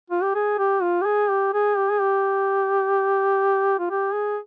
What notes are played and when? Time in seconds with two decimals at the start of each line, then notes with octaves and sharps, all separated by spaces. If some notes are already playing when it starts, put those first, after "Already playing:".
0.10 F4
0.22 G4
0.35 G#4
0.58 G4
0.82 F4
1.02 G4
1.05 G#4
1.30 G4
1.54 G#4
1.77 G4
1.91 G#4
2.01 G4
3.79 F4
3.91 G4
4.13 G#4